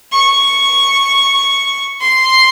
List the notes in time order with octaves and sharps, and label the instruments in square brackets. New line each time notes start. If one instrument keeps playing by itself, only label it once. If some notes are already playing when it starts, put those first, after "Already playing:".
[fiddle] C#6
C6